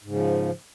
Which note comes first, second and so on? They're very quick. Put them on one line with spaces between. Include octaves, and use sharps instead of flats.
G#2 C#3 F3